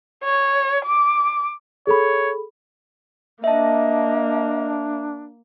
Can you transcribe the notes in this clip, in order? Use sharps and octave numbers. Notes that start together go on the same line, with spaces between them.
C#5
D6
G#4 A4 C#5 B5
A#3 D4 D#5 E5 A5